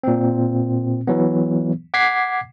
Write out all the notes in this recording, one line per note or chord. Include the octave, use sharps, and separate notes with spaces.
A#2 C4
E3 F#3 B3
F#5 D6 G#6 B6 C7